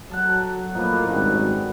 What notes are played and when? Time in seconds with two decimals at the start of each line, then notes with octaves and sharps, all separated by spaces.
0.11 F#3 A4 F#5
0.74 A2 F3 A#3 D#4 B4
1.08 G#1 F#2 G3 F#4